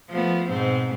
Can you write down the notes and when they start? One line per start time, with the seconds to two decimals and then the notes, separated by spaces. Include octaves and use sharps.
0.10 F3 A3 B3
0.49 G#2 B2 C4